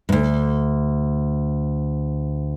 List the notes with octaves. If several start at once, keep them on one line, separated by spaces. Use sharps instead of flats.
D2 G2